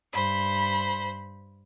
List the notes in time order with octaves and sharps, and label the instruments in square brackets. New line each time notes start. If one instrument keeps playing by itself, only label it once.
[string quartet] G2 C5 B5